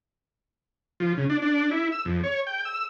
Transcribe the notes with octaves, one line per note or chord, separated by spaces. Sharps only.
F3
C#3
D4
D4
E4
E6
F2
C#5
G5
E6